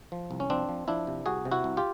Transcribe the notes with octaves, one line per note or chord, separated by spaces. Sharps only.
F3
C2
C#4
F3 C4 D4
F3
F3 D4 E4
C3
C2 F#4 G#4
C3
E4 F#4
C2
F4 G4